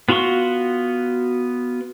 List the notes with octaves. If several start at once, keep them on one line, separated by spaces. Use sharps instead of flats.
B3 F4 F#4 C6 C#6